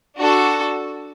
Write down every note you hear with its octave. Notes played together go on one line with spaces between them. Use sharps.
D4 F#4 A4